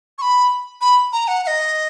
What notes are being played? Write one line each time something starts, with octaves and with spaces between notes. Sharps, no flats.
C#6
B5
B5
A#5
F#5
F#5
D#5